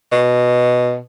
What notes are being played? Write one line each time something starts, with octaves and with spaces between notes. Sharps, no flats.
B2